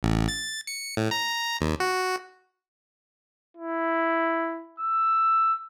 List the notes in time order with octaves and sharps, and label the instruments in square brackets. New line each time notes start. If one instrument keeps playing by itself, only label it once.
[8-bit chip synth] A1
A6
C#7
A2
A#5
D#2
F#4
[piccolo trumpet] E4
E6